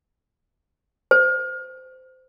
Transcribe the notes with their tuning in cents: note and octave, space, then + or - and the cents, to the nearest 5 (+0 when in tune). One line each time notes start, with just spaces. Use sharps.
C5 -20